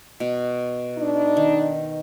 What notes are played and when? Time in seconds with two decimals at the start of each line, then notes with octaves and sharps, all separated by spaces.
0.20 B2
0.97 D4 D#4
1.37 D#3